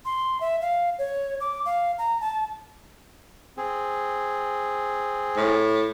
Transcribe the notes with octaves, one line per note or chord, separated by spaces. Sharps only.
C6
E5
F5
C#5
D6
F5
A#5
A5
C4 G#4
A2